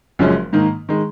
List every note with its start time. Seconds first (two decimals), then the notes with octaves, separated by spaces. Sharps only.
0.19 F#1 F#2 F3 G#3 C#4
0.53 G#2 D#3 A#3
0.89 D#3 G#3